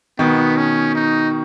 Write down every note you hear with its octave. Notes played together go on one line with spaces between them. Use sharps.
B2 D#3 B3
C#4
D#4